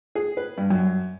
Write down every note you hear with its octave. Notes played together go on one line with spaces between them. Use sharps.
G#4
B4
G2
F#2